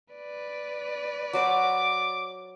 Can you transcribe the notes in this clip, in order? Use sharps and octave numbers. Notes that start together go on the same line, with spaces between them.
B4 D5
F#3 F#4 C5 D6